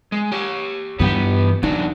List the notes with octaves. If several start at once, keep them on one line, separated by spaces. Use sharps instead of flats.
G#3
G4 C#5
G2 E3 B3 G4
E2 F#3 D4 D#4